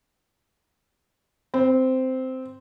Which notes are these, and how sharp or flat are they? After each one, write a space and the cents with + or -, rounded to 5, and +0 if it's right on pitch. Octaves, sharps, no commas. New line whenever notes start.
C4 -10